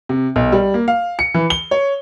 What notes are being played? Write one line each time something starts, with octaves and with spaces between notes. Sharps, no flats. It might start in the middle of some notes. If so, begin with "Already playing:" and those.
C3
B1
G3
A#3
F5
C#7
E3
G7
C#5